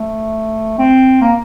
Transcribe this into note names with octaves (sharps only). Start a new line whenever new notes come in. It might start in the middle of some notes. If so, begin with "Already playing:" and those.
Already playing: A3
C4
A#3